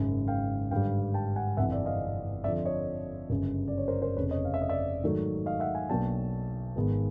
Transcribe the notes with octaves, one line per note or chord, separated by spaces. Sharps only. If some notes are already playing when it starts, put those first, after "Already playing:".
Already playing: G#1 F#2 C#3
F5 G5
G#1 G2 D3 G3 F5 G5
G5 A5
F#5 G#5
G1 F2 C3 E3 E5 F#5
D5 E5
D#5 F5
F2 D3 F3 D5 E5
C#5 D#5
G1 F#2 C#3
D5
C#5
A#4 C5
A#4 C5
F1 F2 C#3 B4 C#5
C#5 D#5
F5
E5
D#5
D5 E5
G#2 D#3 F#3 A3
D#5 F5
E5 F#5
F#5 G#5
B1 B2 F#3 A#3 D4 G5 A5
G#1 G#2 D#3 G#3 B3